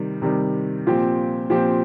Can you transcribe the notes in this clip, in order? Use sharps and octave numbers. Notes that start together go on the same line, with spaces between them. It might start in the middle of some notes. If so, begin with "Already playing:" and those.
Already playing: C3 D#3 G3
C3 D#3 G3
A#2 F3 C4 G4
A#2 F3 C4 G4